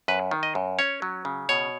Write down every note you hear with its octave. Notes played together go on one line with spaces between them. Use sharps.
F#2 B4
D#3
D#5
F#2
C#4 C#5
F#3
C#3
B2 C#5